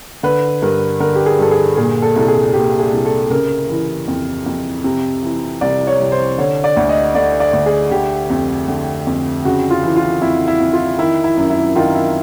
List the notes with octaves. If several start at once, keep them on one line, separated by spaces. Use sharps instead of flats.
D3 B4
G2 A#4
D3 A#4
G4
G#4
G2 A4
G#4
A#2 G#4
A4
C2 A4
G#4
A#2 G4
G#4
C2
A4
C#3 A#4
E3
F2
F2
C3
E3
C2 D5
C#5
C2
C5
D3 C#5
D5
D2
D#5
D3 D5
D5
D2
G#4
D3 G4
F2
D3
F2
C#3 F#4
F4
E3
F4
F2 E4
E4
F2
F4
D#3 E4
E4
F#2
E4
D#3 F4
E4